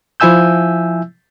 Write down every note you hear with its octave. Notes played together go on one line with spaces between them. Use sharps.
F3 E4 E5 G#5 E6 G6